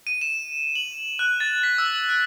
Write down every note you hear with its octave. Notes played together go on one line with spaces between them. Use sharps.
D#7
E7
F#7
F#6
A6
B6
E6
F#6